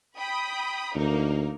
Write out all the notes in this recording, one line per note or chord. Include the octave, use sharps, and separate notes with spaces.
G5 B5 D#6
D2 A#3 D#4 A#4